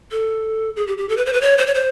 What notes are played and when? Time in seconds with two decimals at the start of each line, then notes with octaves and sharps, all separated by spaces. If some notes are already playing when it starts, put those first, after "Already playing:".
0.11 A4
0.76 G#4
0.87 G4
0.98 G4
1.09 A4
1.17 B4
1.26 C5
1.33 B4
1.41 C#5
1.58 C5
1.66 C#5
1.74 C5